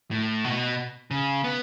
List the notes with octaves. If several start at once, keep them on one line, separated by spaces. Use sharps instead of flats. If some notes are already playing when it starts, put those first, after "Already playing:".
A2
B2
C#3
B3